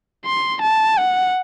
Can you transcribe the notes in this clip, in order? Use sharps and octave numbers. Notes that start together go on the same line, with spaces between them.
C6
A5
F#5